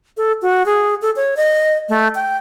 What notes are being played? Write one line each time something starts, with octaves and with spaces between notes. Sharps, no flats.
A4
F#4
G#4
A4
C#5
D#5
A3
G5